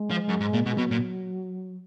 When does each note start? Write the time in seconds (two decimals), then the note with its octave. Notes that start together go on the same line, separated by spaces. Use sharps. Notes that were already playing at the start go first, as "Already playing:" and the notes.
Already playing: G#3
0.10 F3
0.28 F#2
0.40 G#2
0.53 A#2
0.66 B2
0.78 B2 F#3
0.91 A#2